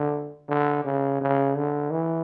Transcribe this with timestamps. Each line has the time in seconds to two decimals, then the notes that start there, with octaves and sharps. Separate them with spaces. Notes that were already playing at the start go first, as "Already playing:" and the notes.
Already playing: D3
0.49 D3
0.85 C#3
1.21 C#3
1.56 D3
1.91 E3